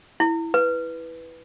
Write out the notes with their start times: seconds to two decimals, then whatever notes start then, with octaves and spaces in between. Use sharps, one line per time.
0.20 E4
0.54 B4